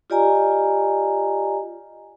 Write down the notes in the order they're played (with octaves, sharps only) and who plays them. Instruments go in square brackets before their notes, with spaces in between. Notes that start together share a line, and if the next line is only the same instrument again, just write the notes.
[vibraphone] F4 G4 D5 D#5 G#5 A#5